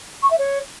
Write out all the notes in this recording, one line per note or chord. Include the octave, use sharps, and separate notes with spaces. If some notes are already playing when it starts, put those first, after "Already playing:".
C#6
E5
C#5